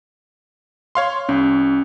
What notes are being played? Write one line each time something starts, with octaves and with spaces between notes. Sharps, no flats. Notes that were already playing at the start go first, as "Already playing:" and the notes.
C#5 F5 C6
C2 C#4